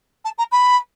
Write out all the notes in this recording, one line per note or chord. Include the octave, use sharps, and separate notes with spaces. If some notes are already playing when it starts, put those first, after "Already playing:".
A5
A#5
B5